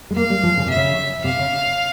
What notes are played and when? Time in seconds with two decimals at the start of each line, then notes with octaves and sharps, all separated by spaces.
0.11 G#3
0.16 A#3 F5
0.30 G3
0.43 F3
0.57 C#3
0.66 C3 E5
0.76 C#3
1.24 C3 F5
1.39 C#3